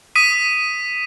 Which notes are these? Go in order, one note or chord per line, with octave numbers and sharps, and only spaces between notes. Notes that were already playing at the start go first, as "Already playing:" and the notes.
D#6 B6 D#7